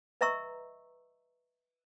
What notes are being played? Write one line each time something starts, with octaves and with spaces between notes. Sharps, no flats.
B4 D#5 E5 A#5 C#6 E6